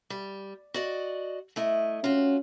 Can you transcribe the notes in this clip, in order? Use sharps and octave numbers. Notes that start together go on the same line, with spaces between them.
G3
F#4 D5 D#5
A3 E4 D#5
C#4 F4 F#4